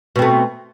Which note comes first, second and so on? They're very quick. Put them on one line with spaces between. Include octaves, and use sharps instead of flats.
B2 C4 A3